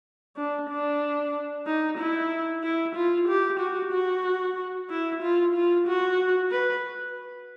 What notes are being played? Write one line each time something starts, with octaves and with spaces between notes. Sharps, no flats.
D4
D4
D#4
E4
E4
F4
G4
F#4
F#4
E4
F4
F4
F#4
B4